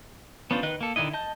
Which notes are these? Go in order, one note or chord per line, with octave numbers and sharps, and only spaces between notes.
B3 C#4 D4 F4 C5
D#3 B4 D#5 F#6
A#3 A4
D3 D#3 D4 E4 D#5
D#5 A5 G6